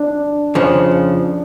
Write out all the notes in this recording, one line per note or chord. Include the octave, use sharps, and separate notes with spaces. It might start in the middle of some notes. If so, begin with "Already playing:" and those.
Already playing: D4
F2 C#3 F3